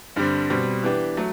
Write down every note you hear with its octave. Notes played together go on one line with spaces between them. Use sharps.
G2 D3 G3 C4
B2 G3 C4
E3 B3 D4 G4
F#3 A3